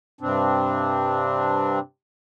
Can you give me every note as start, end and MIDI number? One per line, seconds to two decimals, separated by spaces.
0.21 1.79 43
0.21 1.79 48
0.21 1.79 60
0.21 1.79 62